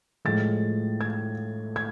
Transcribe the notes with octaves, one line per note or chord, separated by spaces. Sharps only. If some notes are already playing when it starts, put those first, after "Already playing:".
A2 F3 G#3 A6
G#6
G#6